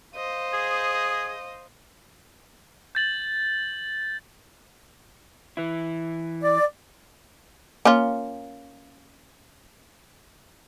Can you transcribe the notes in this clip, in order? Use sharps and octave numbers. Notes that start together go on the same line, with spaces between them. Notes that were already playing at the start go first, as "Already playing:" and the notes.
C5 D#5 F5
G#4
G6 A6 F#7
E3 E4
D5
A#3 C#4 F4